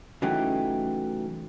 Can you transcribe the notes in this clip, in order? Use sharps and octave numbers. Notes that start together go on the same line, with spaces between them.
C#3 E3 F#3 A3 D#4 G4